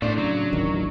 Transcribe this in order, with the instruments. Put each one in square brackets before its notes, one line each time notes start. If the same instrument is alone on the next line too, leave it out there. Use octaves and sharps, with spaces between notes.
[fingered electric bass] A2 [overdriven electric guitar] A3 C5 [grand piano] D4
[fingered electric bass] C#3 [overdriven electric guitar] F#3
[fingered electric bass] D1 A1 D#3